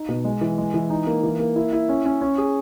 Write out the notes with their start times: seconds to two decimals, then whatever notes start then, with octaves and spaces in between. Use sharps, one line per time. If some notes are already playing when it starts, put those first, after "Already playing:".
Already playing: D#4
0.09 B2
0.24 G#3
0.41 E3
0.58 G#3
0.74 E3
0.90 D#4
1.07 A#3
1.23 E3
1.39 A#3
1.56 E4
1.73 E4
1.89 C#4
2.05 C#4
2.21 C#4
2.38 G#4